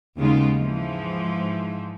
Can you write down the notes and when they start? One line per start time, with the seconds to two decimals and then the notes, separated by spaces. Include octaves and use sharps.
0.16 D#2 C#3 G#3 B3 D#4 F4
0.58 G#2 E3 F3